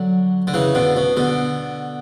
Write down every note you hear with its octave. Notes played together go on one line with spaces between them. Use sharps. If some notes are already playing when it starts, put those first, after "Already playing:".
Already playing: D3 F#3
D3
C#3 E3
B2 D3
B2
B2 D3